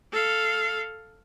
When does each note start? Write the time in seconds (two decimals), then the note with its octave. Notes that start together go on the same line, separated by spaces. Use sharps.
0.12 A4 F5